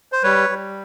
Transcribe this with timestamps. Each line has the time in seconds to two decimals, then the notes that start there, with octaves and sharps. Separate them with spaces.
0.12 C5
0.23 G3 B4 C#5
0.50 G3